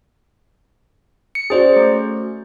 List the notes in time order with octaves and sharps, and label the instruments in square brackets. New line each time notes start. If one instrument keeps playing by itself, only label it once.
[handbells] C#7
[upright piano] C#4 F#4 [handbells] G#4 C5 D5
[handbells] A3